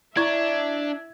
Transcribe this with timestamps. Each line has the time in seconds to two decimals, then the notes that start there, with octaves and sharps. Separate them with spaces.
0.17 D4 E4 E5 A#5 C#6 G#6